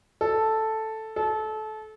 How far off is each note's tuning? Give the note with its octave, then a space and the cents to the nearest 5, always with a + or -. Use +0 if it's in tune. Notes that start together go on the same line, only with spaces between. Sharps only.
A4 +0
A4 -25